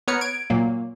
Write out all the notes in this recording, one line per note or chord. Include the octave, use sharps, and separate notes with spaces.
B3 B4 C#5 A#5 F6 C#7
G#6 D7
A#2 F#3 A#3